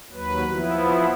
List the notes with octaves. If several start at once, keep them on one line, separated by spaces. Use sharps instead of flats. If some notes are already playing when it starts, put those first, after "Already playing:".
D#2 F#3 B4
F3 B3 E4